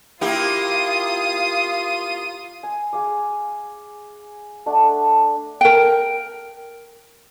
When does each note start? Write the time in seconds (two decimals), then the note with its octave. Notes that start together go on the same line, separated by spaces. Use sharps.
0.21 A#3 E4 F4 G4 D#6
2.63 G#5
2.93 G#4 F5 D6
4.66 A3 D4 F#5
5.61 A#4 G5